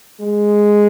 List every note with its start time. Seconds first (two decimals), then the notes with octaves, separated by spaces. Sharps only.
0.20 G#3